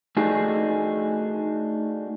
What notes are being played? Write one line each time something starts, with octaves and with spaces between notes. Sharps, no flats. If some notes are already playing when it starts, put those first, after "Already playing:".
A3 D4 D#4 F#4 G#4